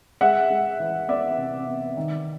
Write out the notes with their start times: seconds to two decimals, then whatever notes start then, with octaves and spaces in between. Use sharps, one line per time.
0.21 G#3 E5 F#5
0.50 G#3
0.80 E3
1.08 B3 D5 E5
1.37 C3
1.67 B3
1.97 D#3